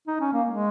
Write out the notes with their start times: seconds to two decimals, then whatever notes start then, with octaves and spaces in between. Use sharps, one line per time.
0.07 D#4
0.20 C#4
0.33 A#3
0.47 G#3